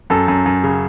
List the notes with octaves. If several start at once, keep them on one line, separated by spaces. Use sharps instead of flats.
F#2 A4
F#2
F#2
C#3